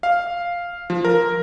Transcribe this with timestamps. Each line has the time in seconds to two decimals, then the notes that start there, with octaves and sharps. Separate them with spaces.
0.03 F5
0.90 F3
1.05 A#4